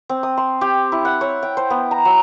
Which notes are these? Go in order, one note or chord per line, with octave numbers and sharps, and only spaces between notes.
C4
D#6
C6
G4
E4
F#5
C#5
G5
C5
B3
A#5
F#3